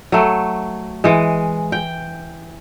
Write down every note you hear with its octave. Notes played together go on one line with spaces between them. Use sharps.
F#3 A3
E3 G#3
G5